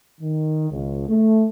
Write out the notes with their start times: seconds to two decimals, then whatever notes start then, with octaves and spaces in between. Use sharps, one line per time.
0.21 D#3
0.70 C#2
1.08 A3